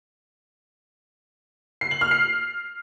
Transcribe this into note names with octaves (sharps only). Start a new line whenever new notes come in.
C7
F#7
F6
C7